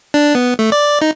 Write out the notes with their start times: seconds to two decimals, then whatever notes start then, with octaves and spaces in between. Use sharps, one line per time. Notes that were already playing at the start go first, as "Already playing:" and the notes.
0.14 D4
0.35 B3
0.59 A3
0.72 D5
1.01 D#4